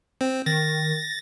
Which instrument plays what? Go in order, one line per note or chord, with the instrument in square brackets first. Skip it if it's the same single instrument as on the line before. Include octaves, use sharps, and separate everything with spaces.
[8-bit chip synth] C4
[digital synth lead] D#3 [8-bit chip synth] A6 A#6